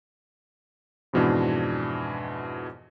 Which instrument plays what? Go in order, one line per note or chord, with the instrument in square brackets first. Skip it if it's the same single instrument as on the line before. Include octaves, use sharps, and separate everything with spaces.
[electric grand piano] F2 G#2 B2 E3 D4